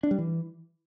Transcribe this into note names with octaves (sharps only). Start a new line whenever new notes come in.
D4
G3
E3